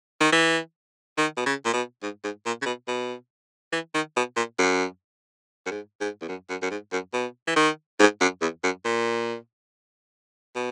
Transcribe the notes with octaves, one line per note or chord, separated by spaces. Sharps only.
D#3
E3
D#3
B2
C#3
A#2
B2
G#2
G#2
A#2
C#3
B2
B2
E3
D#3
B2
A#2
F#2
F#2
G#2
G#2
E2
F#2
F#2
F#2
G#2
F#2
B2
E3
D#3
G#2
F#2
E2
F#2
A#2
B2